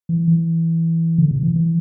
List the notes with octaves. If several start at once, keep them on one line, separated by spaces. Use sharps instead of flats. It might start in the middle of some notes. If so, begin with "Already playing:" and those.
E3
E3
D3
C3
E3
E3